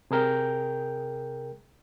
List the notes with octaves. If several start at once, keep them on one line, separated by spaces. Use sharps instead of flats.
C3 G#4 A#4 G5 G6